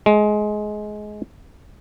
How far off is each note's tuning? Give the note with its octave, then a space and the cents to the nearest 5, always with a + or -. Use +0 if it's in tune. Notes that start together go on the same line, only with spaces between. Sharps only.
G#3 +20